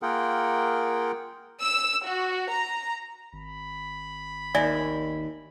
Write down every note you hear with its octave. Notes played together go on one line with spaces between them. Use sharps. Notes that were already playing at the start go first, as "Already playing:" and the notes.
A#3 F4 G#4 A#4 F#5 G5
E6
F#4
A#5
G#1 B5
D#2 D5 E5 G#5